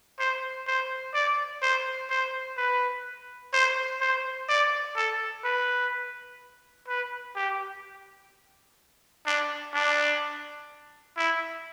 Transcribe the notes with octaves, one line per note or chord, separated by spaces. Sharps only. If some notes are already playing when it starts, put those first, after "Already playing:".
C5
C5
D5
C5
C5
B4
C5
C5
D5
A4
B4
B4
G4
D4
D4
E4